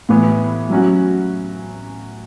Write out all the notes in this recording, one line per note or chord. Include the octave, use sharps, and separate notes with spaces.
A2 E3 B3
F#3 C#4 F#4